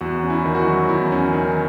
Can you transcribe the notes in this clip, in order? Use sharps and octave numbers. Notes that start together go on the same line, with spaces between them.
E2 F#4
C#4
E4
D#3
F#4
E4
F#3
E2 E4
C#4
D#3